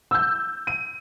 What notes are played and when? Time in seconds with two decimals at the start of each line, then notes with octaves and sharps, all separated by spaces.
0.11 E6 G6
0.67 D#7